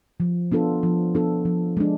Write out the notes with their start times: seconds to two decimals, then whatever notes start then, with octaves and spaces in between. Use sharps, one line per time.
0.20 F3
0.52 B3 D4 F4 A4
0.83 F3
1.15 B3 D4 F4 A4
1.45 F3
1.77 G#3 D4